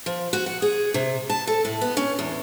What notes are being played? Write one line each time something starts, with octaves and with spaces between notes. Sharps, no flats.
F3
F#4
F#5
G#4
C3
A5
A4
A2
B3
C#4
E2